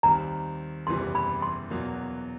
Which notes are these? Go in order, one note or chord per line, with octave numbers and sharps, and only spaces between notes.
D#2 D#3 G3 C4 A#5
F#1 E2 C3 E3 G3 C6
B5
C6
E2 B2 F#3 A#3